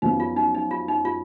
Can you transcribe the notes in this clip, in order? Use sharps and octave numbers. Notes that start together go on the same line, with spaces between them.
F#2 F3 B3 D#4
F4
D#4
D#4
F4
D#4
F4